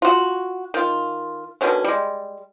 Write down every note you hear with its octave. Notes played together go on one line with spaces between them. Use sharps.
F4 F#4
D#3 F4
B2 D3 D#3 C#4
G3 G#3